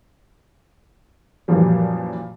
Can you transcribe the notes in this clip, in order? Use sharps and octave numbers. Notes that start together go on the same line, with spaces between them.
F#2 A#2 E3 F3 G3